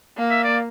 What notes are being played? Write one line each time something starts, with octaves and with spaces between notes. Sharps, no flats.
A#3
E5
D5